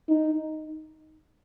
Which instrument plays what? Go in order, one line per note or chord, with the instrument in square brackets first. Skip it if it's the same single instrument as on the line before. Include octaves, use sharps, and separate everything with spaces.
[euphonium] D#4